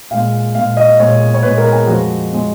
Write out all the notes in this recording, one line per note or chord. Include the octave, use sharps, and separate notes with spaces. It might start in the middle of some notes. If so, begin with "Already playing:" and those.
A#2 G#3 F5
A#2 G#3 F5
D#5
A#2 G#3 C#5
C#5
A#2 G#3 B4
A#4
G#4
F2 F3 G#3 F#4
F3 G#3